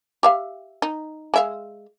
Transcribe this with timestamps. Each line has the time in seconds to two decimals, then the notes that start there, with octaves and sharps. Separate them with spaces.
0.23 G4 E5 F5
0.82 D#4
1.34 G#3 E5 F5